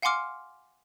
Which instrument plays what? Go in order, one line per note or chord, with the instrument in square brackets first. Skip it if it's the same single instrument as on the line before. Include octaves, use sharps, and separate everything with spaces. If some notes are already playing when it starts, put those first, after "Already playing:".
[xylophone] F5 F#5 G#5 C6 D6 F6